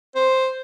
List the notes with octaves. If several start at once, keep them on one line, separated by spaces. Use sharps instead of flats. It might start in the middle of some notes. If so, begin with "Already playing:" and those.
C5